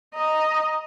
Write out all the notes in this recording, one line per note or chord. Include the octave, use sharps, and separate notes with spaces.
D#5 A#5